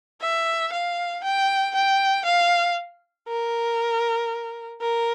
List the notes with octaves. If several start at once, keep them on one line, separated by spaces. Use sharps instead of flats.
E5
F5
G5
G5
F5
A#4
A#4